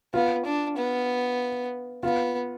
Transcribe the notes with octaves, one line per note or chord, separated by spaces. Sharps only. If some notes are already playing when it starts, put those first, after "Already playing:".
B3 F4
D4
B3
B3 F4